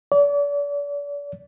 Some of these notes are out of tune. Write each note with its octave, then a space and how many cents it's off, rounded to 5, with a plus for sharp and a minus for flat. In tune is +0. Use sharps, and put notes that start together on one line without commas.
D5 -40